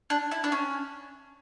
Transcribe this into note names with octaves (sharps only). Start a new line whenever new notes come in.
D4
E4
D4
C#4